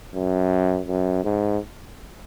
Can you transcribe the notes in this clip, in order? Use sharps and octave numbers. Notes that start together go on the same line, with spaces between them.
F#2
F#2
G#2